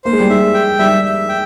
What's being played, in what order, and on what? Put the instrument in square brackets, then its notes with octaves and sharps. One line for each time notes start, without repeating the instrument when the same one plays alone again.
[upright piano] A#3 [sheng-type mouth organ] C5
[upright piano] G#3
G3
[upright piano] G#3 [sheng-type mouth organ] E5
[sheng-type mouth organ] G5
[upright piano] G3 [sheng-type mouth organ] E5
[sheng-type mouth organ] E5
G5